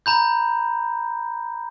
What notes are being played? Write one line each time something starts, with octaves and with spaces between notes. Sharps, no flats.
A#5 B5 G6